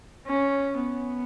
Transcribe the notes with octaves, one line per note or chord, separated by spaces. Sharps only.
C#4
B3